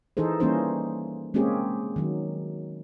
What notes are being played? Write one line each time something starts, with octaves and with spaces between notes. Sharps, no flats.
E3 D#4 G#4 A4 C5
E3 G3 A#3 C#4 D#4 C5
G#3 A#3 C4 C#4 G4 G#4
D#3 F#3